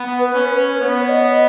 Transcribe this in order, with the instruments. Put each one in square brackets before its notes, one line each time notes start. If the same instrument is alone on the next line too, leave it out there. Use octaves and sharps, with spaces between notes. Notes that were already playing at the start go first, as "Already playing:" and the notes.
Already playing: [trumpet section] B3
[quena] B4
[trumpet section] C#4
[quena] B4
B4
[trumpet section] B3 [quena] C#5
[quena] D#5